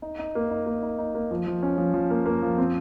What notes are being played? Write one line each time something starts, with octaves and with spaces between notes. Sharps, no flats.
D#4
D#4
A#3
D#4
A#3
D#4
D#4
A#3
F3
F3
C#4
F3
F3
A#3
A#3
F3
C4